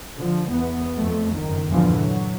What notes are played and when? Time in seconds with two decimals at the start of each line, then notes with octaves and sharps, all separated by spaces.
0.17 D3 F3
0.49 E2 B3
0.96 F2 A3
1.35 F#1 D#3
1.69 E2 G2 A#2 D3 E3 F3
2.00 F#3